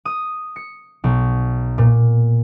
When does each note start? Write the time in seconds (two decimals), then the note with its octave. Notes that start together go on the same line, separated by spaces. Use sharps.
0.05 D#6
0.56 C#7
1.04 B1
1.78 A#2